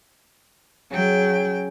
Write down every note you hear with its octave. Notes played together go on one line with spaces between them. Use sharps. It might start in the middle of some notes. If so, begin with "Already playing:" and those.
C#3 F#3 G5